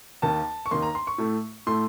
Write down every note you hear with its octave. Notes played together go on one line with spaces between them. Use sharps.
D#2 D#3 A#3 A5
C#6
D#2 D#3 A#3 C6
A#5
C6
C#6
A2 A3
A2 A3 C6